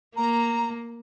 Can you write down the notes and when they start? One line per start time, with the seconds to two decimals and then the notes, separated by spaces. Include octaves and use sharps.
0.16 A#3 A#5